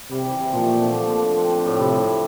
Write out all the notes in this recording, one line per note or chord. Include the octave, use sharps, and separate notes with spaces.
C3 G3
E3
C3
A#2 F3
A3
D3
D4
F3
D4
C4
C4
A2
C3 E4
G2
E4